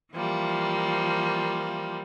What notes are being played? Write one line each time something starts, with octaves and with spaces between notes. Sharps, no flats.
E3 F3 G3 A#3